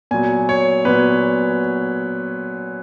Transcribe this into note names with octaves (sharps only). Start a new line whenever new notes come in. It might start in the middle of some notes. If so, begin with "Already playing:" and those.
A#2 F#3 B3 G#5
C#5
A#2 F#3 B3 B4